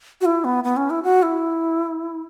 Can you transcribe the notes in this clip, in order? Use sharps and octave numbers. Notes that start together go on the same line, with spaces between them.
F#4
E4
B3
B3
C#4
E4
F#4
E4